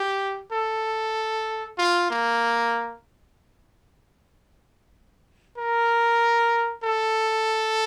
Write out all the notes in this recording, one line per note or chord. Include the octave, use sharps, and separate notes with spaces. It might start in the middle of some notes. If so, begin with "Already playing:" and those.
Already playing: G4
A4
F4
A#3
A#4
A4